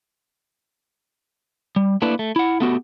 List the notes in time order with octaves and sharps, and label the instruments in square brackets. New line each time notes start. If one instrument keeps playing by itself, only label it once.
[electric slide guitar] G3
A3 A#3 D4 E4 B4
A3
E4 F#5
A3 B3 F#4 G4